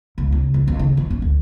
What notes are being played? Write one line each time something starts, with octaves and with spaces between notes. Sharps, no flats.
C#2
C#3
C#2
C#2
D#3
F3
C#4
D2